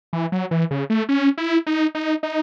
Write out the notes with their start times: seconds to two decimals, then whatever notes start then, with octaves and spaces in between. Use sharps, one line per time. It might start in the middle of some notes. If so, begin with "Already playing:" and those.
0.13 E3
0.32 F#3
0.51 E3
0.71 C#3
0.90 A3
1.09 C#4
1.38 E4
1.67 D#4
1.95 D#4
2.23 D#4